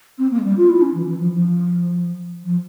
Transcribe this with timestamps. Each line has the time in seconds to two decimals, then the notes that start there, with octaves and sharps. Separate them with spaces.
0.18 C4
0.31 A#3
0.38 G#3
0.44 G3
0.57 F4
0.69 E4
0.82 C#4
0.94 E3
1.06 E3
1.19 F3
1.32 F3
2.44 F3